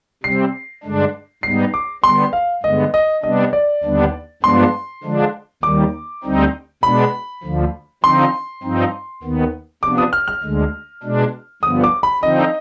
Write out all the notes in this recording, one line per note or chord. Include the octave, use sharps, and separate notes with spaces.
C3 G3 C4 C7
G2 D3 G#3 D4
G#2 G3 B3 D#4 C7
D6
D3 G3 B3 C6
F5
G2 D3 G#3 B3 D#5
D#5
C3 G3 B3 D4 D#5
D5
D#2 D3 G3 B3 D4
G2 F3 G#3 B3 D4 C6
D3 F3 G#3 D4
D#2 D#3 G3 D6
D2 D3 G3 C4 D#4
B2 G#3 B3 D4 B5
D2 D3 F3
D3 F3 C4 D#4 C6
G2 F3 C4 D#4
D#2 D#3 B3
C3 F3 B3 D4 D6
D#6
F6
F6
D2 D3 G#3
B2 G#3 D4
G2 D3 F3 B3 D#6
D6
B5
D3 F3 C4 D#4 D#5